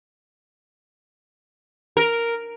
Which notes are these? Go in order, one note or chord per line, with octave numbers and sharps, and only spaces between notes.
A#4